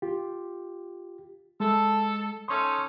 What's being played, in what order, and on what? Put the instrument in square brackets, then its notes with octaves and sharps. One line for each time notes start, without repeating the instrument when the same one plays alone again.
[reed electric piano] F4 G4
[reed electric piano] G#3 [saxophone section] A4
[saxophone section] C#4 D#4 A4 [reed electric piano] C6 C#6 D#6